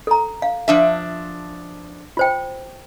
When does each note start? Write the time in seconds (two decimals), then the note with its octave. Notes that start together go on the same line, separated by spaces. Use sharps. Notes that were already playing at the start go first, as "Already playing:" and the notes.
0.07 A4 A#5
0.42 F5
0.68 F3 D4 E5
2.17 F4 C5 G5